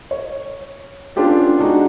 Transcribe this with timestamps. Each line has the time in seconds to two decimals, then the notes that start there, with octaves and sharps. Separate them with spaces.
0.11 C#5
1.16 B3 C#4 D4 F4 G4 A4
1.59 G#3 D4 D#4 F#4